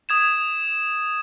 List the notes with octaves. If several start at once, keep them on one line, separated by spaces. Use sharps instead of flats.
D#6 G#6 E7